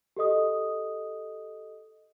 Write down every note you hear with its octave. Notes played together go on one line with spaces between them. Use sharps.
G4 A4 D#5 D#6